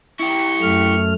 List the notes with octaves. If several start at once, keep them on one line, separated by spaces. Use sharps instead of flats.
E4 G4 C#6
F#2 A3 F6